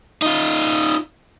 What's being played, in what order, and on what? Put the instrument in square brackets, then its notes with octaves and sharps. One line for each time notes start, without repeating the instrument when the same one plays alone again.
[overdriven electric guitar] D#4 F4